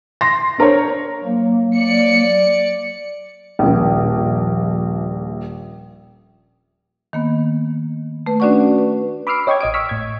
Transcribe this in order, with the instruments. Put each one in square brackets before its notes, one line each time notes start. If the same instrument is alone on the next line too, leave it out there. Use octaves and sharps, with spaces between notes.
[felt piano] C6 A#6
D4 A#4 C5 C#5
[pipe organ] F#3 A#3
[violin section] D5 C#7
[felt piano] D#1 A#1
[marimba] D#3 A#3 B3
A3 B4
C#4 D4 F#4 D5 F#5 C#6
B4
[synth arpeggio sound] B5 D6 E6 F6 C7 D7
C#5 D#5 G5 C#6 D6 G#6
A1 D#5 D#6 D7
C#6 E6 F6 B6
A2 G#6